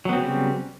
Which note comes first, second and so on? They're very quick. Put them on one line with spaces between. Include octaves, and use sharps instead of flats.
F#3 B3 C4 C#3 G3